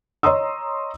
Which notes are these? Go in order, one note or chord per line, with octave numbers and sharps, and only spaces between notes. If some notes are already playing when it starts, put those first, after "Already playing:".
C#5 D#5 A#5 C6 D#6 E6